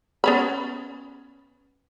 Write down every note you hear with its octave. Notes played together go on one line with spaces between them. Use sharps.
B3 C#4 B5